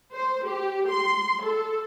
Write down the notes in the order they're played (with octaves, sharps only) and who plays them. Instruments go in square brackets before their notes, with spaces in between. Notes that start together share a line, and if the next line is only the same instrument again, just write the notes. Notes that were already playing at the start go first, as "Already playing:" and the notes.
[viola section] C5
G4
C6
A4